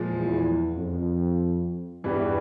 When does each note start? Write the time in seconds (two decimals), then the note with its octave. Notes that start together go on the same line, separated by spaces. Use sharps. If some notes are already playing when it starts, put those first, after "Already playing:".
Already playing: A#2 F3 G#3
0.12 E2
0.76 F2
2.04 E2 G2 E3 G3